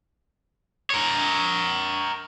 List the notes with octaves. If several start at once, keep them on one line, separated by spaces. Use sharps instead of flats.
A#4 C#5